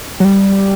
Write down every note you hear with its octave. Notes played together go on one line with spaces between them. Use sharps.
F#3
G3